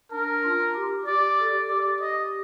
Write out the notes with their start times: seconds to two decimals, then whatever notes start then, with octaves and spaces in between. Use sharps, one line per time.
0.11 D4 A#4
0.44 F4
0.74 G4
1.06 G4 D5
1.38 A4
1.70 G4 D5
2.01 D#5